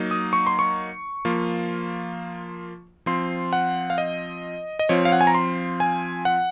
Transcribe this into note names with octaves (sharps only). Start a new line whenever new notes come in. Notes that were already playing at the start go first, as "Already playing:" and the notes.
Already playing: F#3 A#3 D#4
D#6
C#6
C6
C#6
F3 A#3 F4
F3 C4 F4 C6
F#5
F5
D#5
D#5
F3 C4 F4 C#5
F5
F#5
G#5
A#5
C6
G#5
F#5